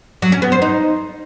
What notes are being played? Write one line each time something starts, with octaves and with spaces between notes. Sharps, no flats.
F#3
C#4
B3
C5
D#4